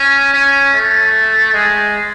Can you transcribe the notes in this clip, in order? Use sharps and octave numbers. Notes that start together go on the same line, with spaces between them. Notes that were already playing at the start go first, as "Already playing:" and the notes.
Already playing: C#4
C#4
A3
G#3